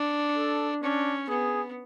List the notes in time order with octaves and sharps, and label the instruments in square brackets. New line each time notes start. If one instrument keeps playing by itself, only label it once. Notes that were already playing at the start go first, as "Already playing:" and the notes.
Already playing: [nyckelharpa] D4
[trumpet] A4
[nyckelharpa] C#4 [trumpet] D4
[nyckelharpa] B3 [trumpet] G#4